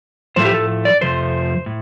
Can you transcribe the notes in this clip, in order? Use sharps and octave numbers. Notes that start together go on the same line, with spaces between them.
A2 F3 A3 C5
G4
A4
D5
F2 C3 F3 A3 C5
A2